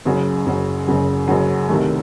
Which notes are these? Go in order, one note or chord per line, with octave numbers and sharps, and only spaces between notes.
F#1 F#2 C#3 F#3
F#1 F#2 C#3 F#3
F#1 F#2 C#3 F#3
F#1 F#2 C#3 F#3
C2 C3 D#3 A3